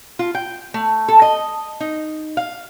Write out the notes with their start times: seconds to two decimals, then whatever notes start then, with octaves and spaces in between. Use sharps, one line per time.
0.19 F4
0.35 G5
0.74 A3
1.08 A4
1.22 D#5
1.80 D#4
2.37 F5